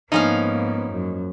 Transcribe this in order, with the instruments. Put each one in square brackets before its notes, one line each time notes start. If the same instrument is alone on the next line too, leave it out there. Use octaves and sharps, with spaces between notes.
[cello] G#2 A#3 [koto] F3 C#4 F5 [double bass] B3 [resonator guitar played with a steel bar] D#4
[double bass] F#2